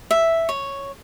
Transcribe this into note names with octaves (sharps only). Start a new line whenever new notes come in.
E5
C#5